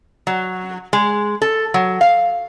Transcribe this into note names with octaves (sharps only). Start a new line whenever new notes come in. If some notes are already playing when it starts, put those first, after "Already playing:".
F#3
G#3
A4
F#3
F5